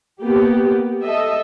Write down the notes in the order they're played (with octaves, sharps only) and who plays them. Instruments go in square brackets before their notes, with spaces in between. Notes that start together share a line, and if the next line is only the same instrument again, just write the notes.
[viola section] A#3 B3 G4
A4 D#5 E5